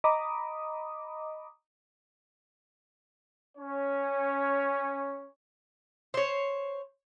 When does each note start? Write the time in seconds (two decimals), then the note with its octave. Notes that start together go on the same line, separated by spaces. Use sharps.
0.04 D#5 A#5 B5 D6 D#6
3.58 C#4 C#5
6.14 C5 C#5